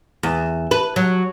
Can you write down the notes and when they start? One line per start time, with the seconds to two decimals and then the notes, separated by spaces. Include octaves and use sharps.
0.23 E2
0.71 B4
0.96 F#3